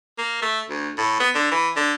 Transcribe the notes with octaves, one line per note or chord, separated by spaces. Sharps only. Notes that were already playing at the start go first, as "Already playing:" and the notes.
A#3
A3
D2
A2
B3
D3
E3
D3